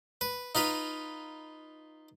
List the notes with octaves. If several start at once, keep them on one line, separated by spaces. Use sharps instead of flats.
B4
D#4 F4 B4 B5